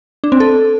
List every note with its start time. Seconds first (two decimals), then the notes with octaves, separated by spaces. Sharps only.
0.24 D4
0.32 C4
0.40 A4